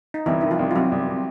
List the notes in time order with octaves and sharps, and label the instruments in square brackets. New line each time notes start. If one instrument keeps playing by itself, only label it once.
[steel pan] D#4
[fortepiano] C2 [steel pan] E3 E4
[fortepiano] D#3 [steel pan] E4
[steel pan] F3 F4
[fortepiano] C2
[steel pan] F4
[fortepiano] C3 [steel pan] F#3 F#4
[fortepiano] C2
C3